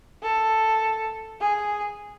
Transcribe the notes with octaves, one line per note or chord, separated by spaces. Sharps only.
A4
G#4